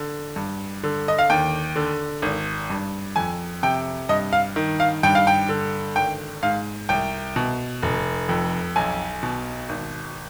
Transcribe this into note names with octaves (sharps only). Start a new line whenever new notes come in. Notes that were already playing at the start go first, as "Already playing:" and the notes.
Already playing: D3
G2
D3
D#5
F5
D#2 G5
D3
G#1
G2
F2 G#5
C3 G5
G2 D#5
F5
D#3
F5
G2 G5
F5
G5
D3
G#1 G5
G#2 F5
C2 G5
B2
F1
F2
B1 G#5
B2
G#1